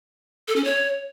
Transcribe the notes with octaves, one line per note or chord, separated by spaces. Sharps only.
A4
C#4
C#5